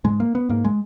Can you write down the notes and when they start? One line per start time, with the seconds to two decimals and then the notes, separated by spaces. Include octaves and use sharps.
0.04 G#2 G#3
0.20 A#3
0.35 B3
0.49 G#2 A#3
0.65 G#3